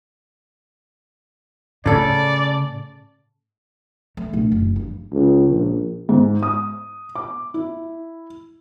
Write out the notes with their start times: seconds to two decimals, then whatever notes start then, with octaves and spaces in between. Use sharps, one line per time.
1.86 A2 C#3 A4 D5
4.17 A3
4.33 A#1
4.52 F#1
4.76 G2
5.12 C#2
5.49 A#1
6.09 G#2
6.43 D#6
7.15 D6
7.54 E4